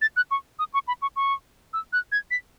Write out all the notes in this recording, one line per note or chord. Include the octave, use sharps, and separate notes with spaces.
A6
F#6
C#6
D#6
C#6
B5
C#6
C#6
E6
F#6
G#6
B6